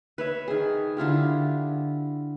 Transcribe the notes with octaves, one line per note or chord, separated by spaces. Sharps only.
B4 C#5 E5
D#3 G#4
D3 E4 F4 G4